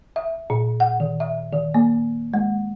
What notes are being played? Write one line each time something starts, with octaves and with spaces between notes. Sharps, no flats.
E5
A#2
F#5
D#3
E5
D#3
A#3
G#3